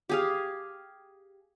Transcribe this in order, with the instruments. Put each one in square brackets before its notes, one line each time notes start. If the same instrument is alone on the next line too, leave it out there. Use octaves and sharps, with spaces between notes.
[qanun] G4 G#4 F5